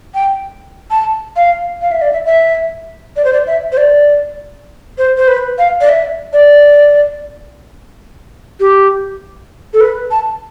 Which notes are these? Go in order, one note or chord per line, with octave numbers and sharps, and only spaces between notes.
G5
A5
F5
F5
E5
D5
E5
E5
D5
C5
D5
E5
C5
D5
C5
C5
B4
F5
D5
E5
D5
G4
A4
B4
A5